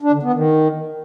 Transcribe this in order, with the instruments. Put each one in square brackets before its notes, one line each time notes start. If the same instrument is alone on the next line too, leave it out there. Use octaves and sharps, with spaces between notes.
[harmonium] D4
D3
B3
D#3